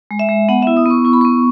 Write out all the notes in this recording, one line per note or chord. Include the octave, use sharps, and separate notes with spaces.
G#3
E5
G#3
B3 F#5
E4 E5
D#6
B3 C#6
E4 C#6
B5
B3 C#6